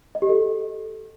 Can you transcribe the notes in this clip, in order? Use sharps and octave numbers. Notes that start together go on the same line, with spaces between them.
D#5
G4
A4